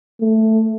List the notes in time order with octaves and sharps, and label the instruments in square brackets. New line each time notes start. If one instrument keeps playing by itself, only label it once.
[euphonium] A3